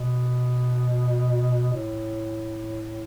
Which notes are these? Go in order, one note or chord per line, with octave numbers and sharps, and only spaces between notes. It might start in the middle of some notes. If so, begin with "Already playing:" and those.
Already playing: B2
A2